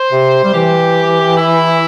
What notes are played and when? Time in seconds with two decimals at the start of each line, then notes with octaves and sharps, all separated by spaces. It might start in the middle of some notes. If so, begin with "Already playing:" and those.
Already playing: C5
0.12 C3
0.44 G3
0.54 E3 G4
1.37 E4